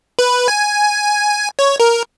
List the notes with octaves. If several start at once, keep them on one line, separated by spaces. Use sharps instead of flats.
B4
G#5
C#5
A#4